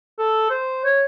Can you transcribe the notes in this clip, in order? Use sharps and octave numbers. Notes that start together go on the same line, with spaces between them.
A4
C5
C#5